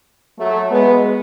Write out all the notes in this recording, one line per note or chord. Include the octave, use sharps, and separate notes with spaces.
F#3 A3
G#3 B3